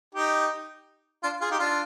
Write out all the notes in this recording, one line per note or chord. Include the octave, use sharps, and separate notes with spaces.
D#4 G4
D4 F4
F4 G#4
D#4 G4
D4 F4